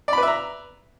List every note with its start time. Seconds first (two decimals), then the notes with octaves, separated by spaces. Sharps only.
0.08 D5
0.13 B5
0.18 B4
0.23 E5
0.27 A#5